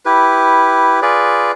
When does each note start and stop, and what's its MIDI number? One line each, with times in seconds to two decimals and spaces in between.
0.05 1.00 64
0.05 1.00 67
0.05 1.00 71
1.02 1.52 65
1.02 1.52 68
1.02 1.52 71
1.02 1.52 74